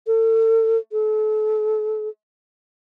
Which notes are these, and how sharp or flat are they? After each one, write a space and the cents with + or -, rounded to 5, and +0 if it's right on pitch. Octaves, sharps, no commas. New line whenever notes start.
A4 +35
A4 -35